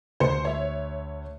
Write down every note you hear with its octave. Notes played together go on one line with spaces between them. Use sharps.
D2 C5 C#7
C#5 E5